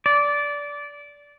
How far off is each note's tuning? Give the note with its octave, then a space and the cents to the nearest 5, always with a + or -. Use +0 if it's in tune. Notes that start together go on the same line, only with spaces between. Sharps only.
D5 -15